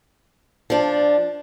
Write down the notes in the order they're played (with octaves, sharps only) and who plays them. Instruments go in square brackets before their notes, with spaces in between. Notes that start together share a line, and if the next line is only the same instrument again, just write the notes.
[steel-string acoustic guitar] F3 D4